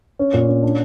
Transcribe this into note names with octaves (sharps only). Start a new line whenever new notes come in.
C#4
A#2
C#4
D4